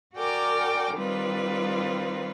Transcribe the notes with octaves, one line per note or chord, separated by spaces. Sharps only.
F#4 A#4 D5 G5 G#5 D6
D#3 G3 C4 F4 B4